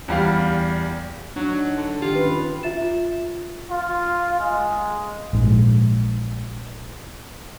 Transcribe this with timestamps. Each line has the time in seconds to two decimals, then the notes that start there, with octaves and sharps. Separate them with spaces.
0.08 E2 G3 F5
1.36 F#3 D4 D#4
1.77 D3
2.02 D#3 F4 G4
2.15 C#4 B4
2.63 F4 E5 A6 E7
3.70 F4
4.40 G#3
5.33 A#1 G#2